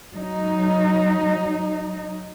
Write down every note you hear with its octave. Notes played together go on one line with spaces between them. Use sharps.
F#3 D#4